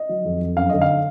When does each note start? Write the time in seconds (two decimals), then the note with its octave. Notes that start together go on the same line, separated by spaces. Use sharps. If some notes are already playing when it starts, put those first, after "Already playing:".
Already playing: D#5
0.09 F#3
0.25 F2
0.41 F2
0.57 F#2 F5
0.70 D3 D#5
0.82 F5